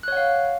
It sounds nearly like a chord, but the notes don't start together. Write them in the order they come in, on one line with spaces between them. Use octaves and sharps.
F#6 C#5 F#5 F5